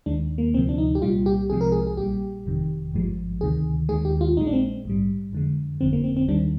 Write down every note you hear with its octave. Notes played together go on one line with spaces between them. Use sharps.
D#2 D#3 G#3 D4
A#3
D2 C3 F3 C4
D4
D#4
G4
C2 A#2 G3 F4
G4
C2 C3 F3 G#3 G#4
A#4
G#4
G#4
A#1 A#2 G3 G4
G1 F2 C3 D#3
G#1 G2 F3 G#3
D2 C3 D#3 G#4
D#2 D#3 G#3 G#4
G4
F4
A#1 A#2 G#3 D#4
D4
C4
A#1 G#2 G3
F2 D3 G#3
G1 F2 D3 C4
A#3
C4
C4
D#2 D#3 G3 D4